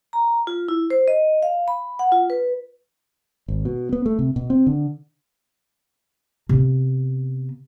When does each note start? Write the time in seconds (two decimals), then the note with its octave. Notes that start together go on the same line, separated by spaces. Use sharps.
0.13 A#5
0.47 F4
0.68 E4
0.90 C5
1.08 D#5
1.43 F5
1.68 B5
1.99 F#5
2.12 F4
2.30 B4
3.48 G#1
3.65 B2
3.93 B3
4.06 A3
4.19 C3
4.36 B2
4.50 C4
4.67 D3
6.49 C3 B3